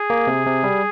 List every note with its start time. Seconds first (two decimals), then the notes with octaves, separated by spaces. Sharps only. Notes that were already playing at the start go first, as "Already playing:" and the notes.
Already playing: G#4
0.10 A#3
0.27 C3
0.47 C3
0.64 G3